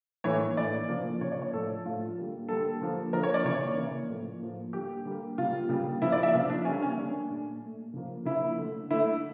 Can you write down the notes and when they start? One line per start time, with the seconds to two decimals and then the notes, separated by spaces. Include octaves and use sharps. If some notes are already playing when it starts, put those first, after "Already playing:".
0.24 A2 E3 A#3 C#5
0.56 A2 E3 A#3 D5
0.88 C#3 F3 A#3
1.21 C#3 F3 A#3 C#5
1.32 D5
1.42 C#5
1.53 A2 F3 A3 A4
1.86 A2 F3 A3 F4
2.17 D3 G3 A#3
2.48 D3 G3 A#3 A4
2.81 D3 F3 A#3
3.13 D3 F3 A#3 A#4
3.23 C#5
3.34 D5
3.45 C#3 E3 A#3 C#5
3.77 C#3 E3 A#3
4.09 A2 F3 A#3
4.41 A2 F3 A#3
4.73 D3 G3 A#3 G4
5.05 D3 G3 A#3
5.38 C#3 G3 A#3 F4
5.69 C#3 G3 A#3
6.02 C#3 F3 A#3 E4
6.12 D5
6.23 E5
6.33 C#3 F3 A#3 F4
6.50 D4
6.65 D3 G3 A#3 C#4
6.82 C#4
6.97 D3 G3 A#3 D4
7.30 A#2 A3
7.62 A#2 A3
7.93 C#3 F3 A#3
8.25 C#3 F3 A#3 E4
8.58 D3 A3
8.91 D3 A3 E4